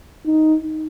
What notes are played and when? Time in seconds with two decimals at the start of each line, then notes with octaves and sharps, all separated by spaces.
0.26 D#4